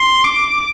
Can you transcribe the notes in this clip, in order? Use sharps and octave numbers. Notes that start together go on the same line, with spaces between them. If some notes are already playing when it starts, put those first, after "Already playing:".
Already playing: C6
D6